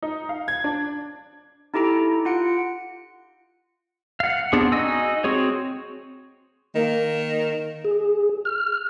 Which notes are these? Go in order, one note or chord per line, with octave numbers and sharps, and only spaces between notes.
D#4
F5
G#6
D4
D#4 E4 G4 A4 A#5
F4 F#5 C#7 D7
F5 F#5
B3 C4 D4 G#4
D#4 F#4 D#5 G#5 E6
C4 F#4 G#4 C#5
D#3 A#3
G#4
F6